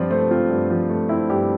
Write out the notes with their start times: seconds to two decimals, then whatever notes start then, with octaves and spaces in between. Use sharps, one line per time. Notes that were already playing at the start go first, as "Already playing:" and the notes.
Already playing: G2 F3 C4 F4 C5 D5
0.11 A3 C5
0.31 C4 F4
0.50 G2
0.70 F3
0.90 A3
1.09 C4 E4
1.29 G2 G4